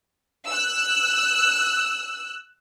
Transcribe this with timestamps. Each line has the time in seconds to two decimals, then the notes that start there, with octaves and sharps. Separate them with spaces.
0.48 E6 F#6